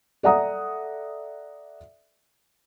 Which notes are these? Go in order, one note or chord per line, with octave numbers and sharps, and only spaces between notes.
A4 D5 E5 F#5 A#5 D#6